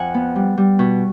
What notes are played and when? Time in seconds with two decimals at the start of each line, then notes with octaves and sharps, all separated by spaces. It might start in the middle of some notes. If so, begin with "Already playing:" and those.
Already playing: F2 F#5 G#5
0.14 B3
0.35 G3
0.58 G3
0.79 B2